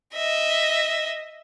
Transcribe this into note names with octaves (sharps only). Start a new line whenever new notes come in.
D#5 E5